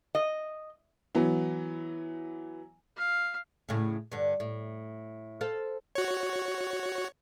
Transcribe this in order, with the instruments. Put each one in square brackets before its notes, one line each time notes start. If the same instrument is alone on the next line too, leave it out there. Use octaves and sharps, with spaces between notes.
[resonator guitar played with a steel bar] D#5
[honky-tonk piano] E3 F#3 B3
[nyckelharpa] F5
[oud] A2 C#3
G2 D3
A2
A4 C5 F5
[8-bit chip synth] F#4 C#5